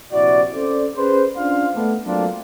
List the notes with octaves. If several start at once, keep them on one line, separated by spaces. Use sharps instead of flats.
A#1 C3 E4 F#4 D5
C#4 A4 C5 D5
C#4 G#4 B4 C5
C#4 D4 F4 F5
A3 B3 D4
F#3 A3 A#3 C4 D4 F4